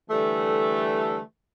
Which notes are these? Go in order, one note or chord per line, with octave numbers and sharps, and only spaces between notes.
D3 E3 G3 A3